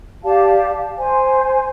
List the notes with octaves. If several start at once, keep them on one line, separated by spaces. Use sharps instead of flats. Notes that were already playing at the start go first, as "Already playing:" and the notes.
G4 D5 F5 A5
C5 G#5